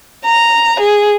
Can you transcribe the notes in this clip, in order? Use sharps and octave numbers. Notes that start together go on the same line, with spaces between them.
A#5
G#4